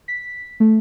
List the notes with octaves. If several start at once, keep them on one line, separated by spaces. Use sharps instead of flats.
B6
A3